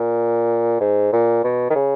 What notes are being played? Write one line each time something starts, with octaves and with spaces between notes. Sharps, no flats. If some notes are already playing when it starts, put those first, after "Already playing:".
Already playing: A#2
G#2
A#2
B2
D#3
C#3